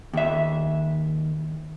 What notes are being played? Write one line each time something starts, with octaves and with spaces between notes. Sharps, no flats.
D#2 E5